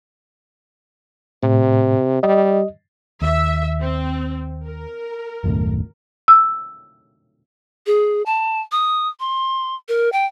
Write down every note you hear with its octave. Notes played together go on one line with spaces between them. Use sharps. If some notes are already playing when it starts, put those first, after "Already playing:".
A2 C3
G3 D#5
D#2 E5
C4
A#4
F#1 D#2 A2
E6
G#4
A5
D#6
C6
A#4
G5